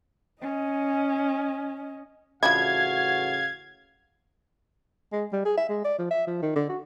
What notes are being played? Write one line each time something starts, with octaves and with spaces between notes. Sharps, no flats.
C#4 D#5
A1 C#3 F3 D4 E4 F#4 F5 G#6
G#3
G3
G#4
E5
G#3
D5
F3
E5
F3
D#3
D3
F#4